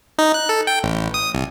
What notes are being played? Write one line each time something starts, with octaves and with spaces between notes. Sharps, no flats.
D#4
F#6
A4
G5
A1
D#6
C2